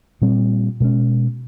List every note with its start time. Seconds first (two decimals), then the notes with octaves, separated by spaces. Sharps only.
0.22 A#2 G3 C4
0.80 B2 G#3 C#4